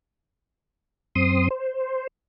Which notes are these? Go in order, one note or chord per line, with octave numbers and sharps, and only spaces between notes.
F#2 C4 C6 D#6
C5